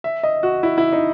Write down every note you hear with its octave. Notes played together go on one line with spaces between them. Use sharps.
E5
D#5
F#4
E4
E4
D#4